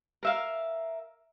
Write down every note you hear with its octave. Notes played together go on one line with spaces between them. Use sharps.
A#4 E5 F5